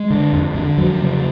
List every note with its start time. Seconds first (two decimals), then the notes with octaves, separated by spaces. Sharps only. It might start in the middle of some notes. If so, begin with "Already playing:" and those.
Already playing: G#3
0.10 D3
0.33 F2
0.55 D3
0.77 F2 F#3
1.00 C#3